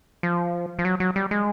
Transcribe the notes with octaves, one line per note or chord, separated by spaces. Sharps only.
F3
F3
F#3
F#3
G3
G#3